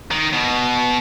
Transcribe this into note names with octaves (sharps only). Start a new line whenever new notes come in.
D#3
B2